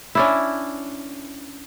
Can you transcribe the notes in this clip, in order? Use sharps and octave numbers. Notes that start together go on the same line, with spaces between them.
C#4 D4 E4